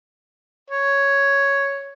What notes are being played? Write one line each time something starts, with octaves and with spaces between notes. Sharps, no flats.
C#5